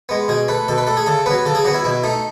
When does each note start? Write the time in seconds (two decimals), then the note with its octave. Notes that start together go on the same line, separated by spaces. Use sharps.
0.09 G#3 B3
0.28 B2 G#4
0.48 A3 B4
0.68 B2 A4
0.78 B4
0.87 A3 A4
0.97 G#4
1.06 C#3 A4
1.26 F#3 B3 B4
1.46 C#3 A4
1.55 G#4
1.65 F#3 B3 F#4
1.74 E4
1.85 B2 E4
2.03 A3 D#4